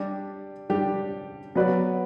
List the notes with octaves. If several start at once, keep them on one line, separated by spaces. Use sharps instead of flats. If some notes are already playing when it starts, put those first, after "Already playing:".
Already playing: G3 D4 G4
G3 D4 G4
F#3 B3 F#4 B4 D5